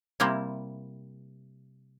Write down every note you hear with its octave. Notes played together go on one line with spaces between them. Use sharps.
C3 G3 A#3 C4 E4